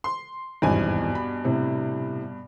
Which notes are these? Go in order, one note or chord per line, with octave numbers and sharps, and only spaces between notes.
C6
G#1 E2 G2 B2 G#5
B5
A2 C3